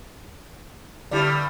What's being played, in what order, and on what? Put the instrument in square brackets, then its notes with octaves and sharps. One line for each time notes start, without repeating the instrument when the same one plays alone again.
[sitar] G2 G3 [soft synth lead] D3 [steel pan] E4 G4 D5